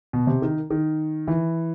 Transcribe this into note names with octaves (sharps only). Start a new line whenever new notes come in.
B2
C3
D#3
D#3
E3